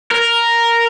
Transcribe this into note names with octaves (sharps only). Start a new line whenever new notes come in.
A#4